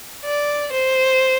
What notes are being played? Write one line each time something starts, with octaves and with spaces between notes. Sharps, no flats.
D5
C5